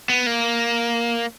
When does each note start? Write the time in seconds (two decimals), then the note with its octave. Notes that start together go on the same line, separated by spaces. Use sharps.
0.10 B3
0.26 A#3